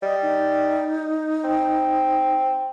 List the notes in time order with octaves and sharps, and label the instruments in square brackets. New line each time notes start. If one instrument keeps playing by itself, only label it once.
[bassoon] G3 [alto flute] D#5
[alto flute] D#4
[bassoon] C4